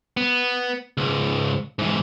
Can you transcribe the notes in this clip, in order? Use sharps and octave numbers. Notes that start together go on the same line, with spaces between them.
B3
C#2 G#2
G#2 E3